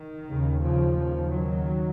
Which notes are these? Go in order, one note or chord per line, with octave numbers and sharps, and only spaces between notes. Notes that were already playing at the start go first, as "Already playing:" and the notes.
Already playing: D#3
D#2 C#3
C#3 F3
D#2 C#3
D#3 F#3